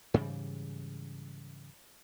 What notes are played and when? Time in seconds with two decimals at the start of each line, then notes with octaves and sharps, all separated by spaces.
0.14 G#2 C#3 E3 G3